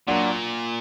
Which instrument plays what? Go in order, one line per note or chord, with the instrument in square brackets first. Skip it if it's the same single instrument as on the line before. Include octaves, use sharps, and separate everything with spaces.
[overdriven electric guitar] A#2 [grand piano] F#3 A#3 D4 F#4